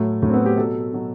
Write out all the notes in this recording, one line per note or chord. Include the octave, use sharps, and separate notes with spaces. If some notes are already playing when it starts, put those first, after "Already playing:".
Already playing: A2 F#3 A3
A2 F#3 A3
C4
B3
G4
B2 F#3 A4
B2 F#3